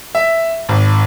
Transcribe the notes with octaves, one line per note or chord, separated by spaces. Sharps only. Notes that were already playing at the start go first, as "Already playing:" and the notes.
E5
G#1